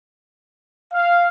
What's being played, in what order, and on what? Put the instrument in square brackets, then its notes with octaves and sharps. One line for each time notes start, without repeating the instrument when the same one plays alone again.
[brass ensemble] F5